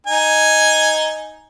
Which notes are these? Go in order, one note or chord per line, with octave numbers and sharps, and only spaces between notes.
D#4 G#5